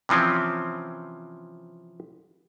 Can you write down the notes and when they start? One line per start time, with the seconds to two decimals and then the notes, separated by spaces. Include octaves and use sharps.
0.09 C3 E3 F3 C4 C#4